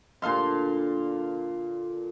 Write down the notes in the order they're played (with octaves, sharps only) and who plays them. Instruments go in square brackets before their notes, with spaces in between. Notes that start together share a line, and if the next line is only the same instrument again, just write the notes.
[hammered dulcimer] A#2 D3 F5 C6